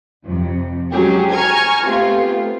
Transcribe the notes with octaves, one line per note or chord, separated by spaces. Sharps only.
F2 C3
F#3 G#3 C#4 G4 G#4
G#5 A#5 C#6 F6 G#6
C3 A3 B3 F4